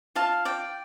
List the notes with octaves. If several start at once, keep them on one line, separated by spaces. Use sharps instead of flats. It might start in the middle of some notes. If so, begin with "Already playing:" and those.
F4 F5 A5
D5 G5